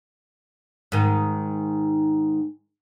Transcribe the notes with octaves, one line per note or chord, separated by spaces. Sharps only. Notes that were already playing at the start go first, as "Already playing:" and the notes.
G#2 D#3